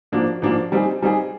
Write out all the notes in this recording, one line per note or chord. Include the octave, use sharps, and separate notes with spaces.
G#2 F3 A#3 D4 F#4
G#2 F3 A#3 D4 F#4
G3 C4 D#4 G#4
G3 C4 D#4 G#4